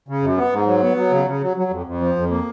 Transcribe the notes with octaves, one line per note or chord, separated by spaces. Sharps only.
C#3
F#2
B3
G#2
F#3
B3
F#3
C#3
C#3
F#3
F#3
F2
F2
F3
F2
A#3